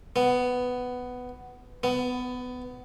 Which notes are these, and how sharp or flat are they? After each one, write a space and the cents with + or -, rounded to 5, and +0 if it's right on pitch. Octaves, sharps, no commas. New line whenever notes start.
B3 +10
B3 +20